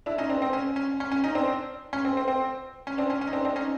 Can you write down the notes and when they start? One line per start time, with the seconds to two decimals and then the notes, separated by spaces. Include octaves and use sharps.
0.06 D4 E4
0.18 C#4 D#4
0.29 C4 D4
0.42 C4
0.53 C#4
0.76 C#4
1.00 C#4
1.12 C#4
1.24 C#4 D#4
1.35 C4 D4
1.93 C#4
2.05 C4
2.17 C4
2.28 C4
2.87 C#4
2.98 C4 D4
3.10 C#4
3.21 C#4
3.27 D#4
3.33 C4 D4
3.45 C4 D4
3.56 C#4 D#4